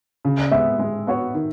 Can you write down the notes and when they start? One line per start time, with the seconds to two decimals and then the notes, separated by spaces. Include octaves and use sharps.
0.25 C#3
0.51 G#3 B3 E5
0.79 G#3
1.07 B3 F#4 C#5
1.34 D#3